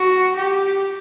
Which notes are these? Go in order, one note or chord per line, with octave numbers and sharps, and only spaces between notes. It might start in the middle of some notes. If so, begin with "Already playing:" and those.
Already playing: F#4
G4